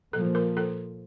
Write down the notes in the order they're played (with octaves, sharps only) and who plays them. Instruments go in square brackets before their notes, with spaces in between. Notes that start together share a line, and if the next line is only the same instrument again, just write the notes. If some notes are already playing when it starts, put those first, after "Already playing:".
[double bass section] A#2 F3 A#3 [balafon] A4
[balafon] A#4
A4